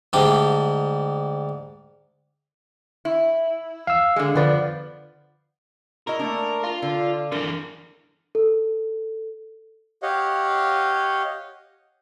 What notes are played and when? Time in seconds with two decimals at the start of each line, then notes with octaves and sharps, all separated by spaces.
0.13 D2 G#2 G3 D4 G5
3.05 E4
3.87 F5 E6
4.16 D3 G#3
4.35 D3 F3 B3 B4 D5
6.07 E4 F#4 A#4 D#5
6.19 A3 A#3 D4
6.64 F4
6.82 D3
7.32 D3 E3 A#4
8.35 A4
10.03 G4 C#5 D#5 F5 F#5